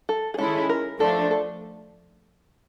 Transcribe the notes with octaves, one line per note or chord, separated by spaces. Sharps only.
A4
G#4
D#3 G#3 C#4 E4 A4
A#4
F3 A3 D4 A4
A4